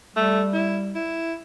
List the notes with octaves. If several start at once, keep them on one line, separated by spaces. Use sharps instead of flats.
G3 A3
E4
E4